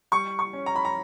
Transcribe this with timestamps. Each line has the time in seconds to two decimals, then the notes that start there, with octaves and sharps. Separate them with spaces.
0.12 G3 C#6
0.39 C#6
0.53 C#4
0.66 A#5
0.76 B5
0.85 A#5